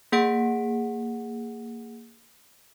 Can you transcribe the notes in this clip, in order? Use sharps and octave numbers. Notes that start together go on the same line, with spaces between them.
A#3 G#4 F#5 B6 D7